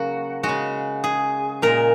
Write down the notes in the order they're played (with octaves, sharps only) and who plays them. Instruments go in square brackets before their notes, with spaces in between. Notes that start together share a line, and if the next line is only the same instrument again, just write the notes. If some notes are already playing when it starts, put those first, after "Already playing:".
Already playing: [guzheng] C#3 F#3 A#3 F#4
G#3 F#4
C#3
G#4
A#2 G#3 A#4